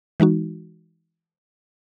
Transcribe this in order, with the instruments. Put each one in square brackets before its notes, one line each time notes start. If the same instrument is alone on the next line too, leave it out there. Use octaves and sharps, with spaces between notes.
[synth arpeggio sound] E3 G#3 D#4 F#4